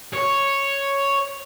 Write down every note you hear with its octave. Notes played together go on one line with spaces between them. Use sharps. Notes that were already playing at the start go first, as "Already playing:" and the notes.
C#5